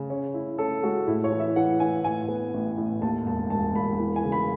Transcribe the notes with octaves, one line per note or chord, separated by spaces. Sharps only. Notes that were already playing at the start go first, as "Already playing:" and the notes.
Already playing: C#3
C#4
E4
C#4 A4
G#3 F#4
A2 E4
C#5
E3
E5
E3 F#5
E3 G#5
A2 G#5
B3
A1
A2
D#2 A5
E1 A5
E1 A5
E1 B5
E3
G#5
C#3
B5